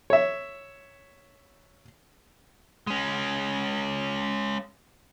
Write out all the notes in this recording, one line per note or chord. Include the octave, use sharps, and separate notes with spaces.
C#5 E5
G#3 C#4